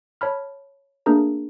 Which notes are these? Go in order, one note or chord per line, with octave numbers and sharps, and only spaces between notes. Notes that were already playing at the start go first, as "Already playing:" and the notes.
C#5 A5 B5 F6
A3 A#3 D4 G#4 A#4 A#5